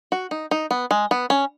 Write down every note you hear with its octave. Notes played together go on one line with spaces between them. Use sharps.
F#4
D#4
D#4
B3
G#3
B3
C#4